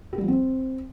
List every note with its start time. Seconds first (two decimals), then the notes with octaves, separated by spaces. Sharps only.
0.13 G4
0.18 G3
0.23 F3
0.28 C4